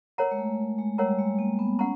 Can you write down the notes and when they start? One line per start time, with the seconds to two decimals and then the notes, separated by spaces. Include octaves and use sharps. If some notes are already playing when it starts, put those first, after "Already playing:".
0.18 A#4 C#5 F#5 A#5
0.31 G#3
0.38 A3
0.78 G#3
0.98 G3 A#4 C#5 F#5 A#5
1.19 G#3
1.39 A#3
1.59 B3
1.79 C#4 F#5 A#5